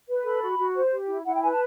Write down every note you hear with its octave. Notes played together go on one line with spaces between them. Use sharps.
B4
A4 B5
F#4
F#4
C5
G4
E4
E4 F#5
G5
B4 G#5
A5